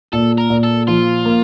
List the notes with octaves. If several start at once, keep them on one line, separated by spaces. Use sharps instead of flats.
A#2 A4
A#4
A#2
A4
F3 F4
A#3